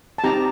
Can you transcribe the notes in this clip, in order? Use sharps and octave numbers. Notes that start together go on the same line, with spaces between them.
A5
C4 D#4 G4 A#5